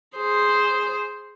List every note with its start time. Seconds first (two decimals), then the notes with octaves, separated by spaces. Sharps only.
0.16 G#4 C5